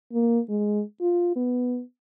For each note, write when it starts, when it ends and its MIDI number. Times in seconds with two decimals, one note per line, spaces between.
0.13 0.39 58
0.49 0.82 56
1.01 1.31 65
1.36 1.81 59